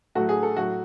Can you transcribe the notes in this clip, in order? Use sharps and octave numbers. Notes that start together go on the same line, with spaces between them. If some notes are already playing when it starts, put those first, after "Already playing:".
A2 F#3 A3 F#4
G#4
A4
A2 F#3 A3 F#4